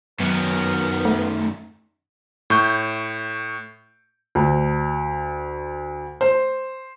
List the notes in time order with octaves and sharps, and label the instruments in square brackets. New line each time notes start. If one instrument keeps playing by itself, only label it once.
[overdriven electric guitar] F#2 D#3 [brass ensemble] F#3 A#4 [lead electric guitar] B3
[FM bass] A3
[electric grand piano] A2 C#6 G6
[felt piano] D2
C5